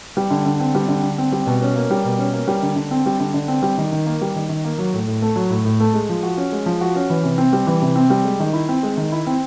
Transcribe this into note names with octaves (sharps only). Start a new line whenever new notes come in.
G3
D3
D3
C4
G3
D3
D3
C4
G3
B2
C#4
A#3
G3
B2
C#4
A#3
G3
D3
D3
C4
G3
D3
D3
C4
G3
D#3
D#3
A#3
G3
D#3
D#3
A#3
F#3
A2
A2
A3
F#3
A2
A2
A3
G#3
F3
F#4
C#4
G#3
F3
F#4
C#4
E3
C3
C4
G3
E3
C3
C4
G3
G#3
D#3
E4
C4
G#3
D#3
E4
C4